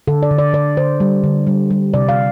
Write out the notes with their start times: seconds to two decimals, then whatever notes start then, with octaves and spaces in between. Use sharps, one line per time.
0.07 D3 A4
0.23 D5
0.31 D3
0.38 D5
0.53 D3 D5
0.77 D3 C5
1.00 G3
1.24 D3
1.47 G3
1.70 G3
1.94 C3 D5
2.09 F5